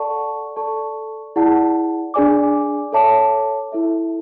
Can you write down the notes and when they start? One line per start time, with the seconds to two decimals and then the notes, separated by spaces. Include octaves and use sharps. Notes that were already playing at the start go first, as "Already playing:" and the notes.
Already playing: A4 D5 F#5 A5 C#6
0.56 A4 D5 A5 C#6
1.36 E4 G#4 D5 F#5 A5
2.14 D4 G#4 D5 G#5 D6
2.93 A4 C#5 E5 A5 D6
3.72 E4 A4 E5